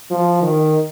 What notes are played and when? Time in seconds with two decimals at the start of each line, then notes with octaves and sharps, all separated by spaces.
0.11 F3
0.42 D#3